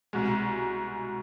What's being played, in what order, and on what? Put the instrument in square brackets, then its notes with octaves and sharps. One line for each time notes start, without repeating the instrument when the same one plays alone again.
[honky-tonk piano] C2 B2 G#3